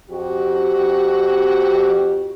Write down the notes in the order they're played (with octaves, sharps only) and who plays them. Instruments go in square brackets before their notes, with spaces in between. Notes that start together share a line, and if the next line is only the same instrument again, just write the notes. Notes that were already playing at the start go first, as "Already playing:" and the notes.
[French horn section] F2 F#4 G4